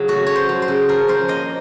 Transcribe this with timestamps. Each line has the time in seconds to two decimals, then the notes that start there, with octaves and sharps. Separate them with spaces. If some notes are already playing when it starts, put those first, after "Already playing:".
Already playing: C#3 F#3
0.08 A3 F#4
0.27 A3 C#5
0.35 C5
0.49 F#3
0.62 C5
0.68 C#3
0.89 F3 A#4
1.08 F3 C5
1.28 A#3 D#5